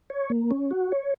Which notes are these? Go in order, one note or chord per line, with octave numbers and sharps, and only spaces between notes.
C#5
A#3
C#4
F#4
C#5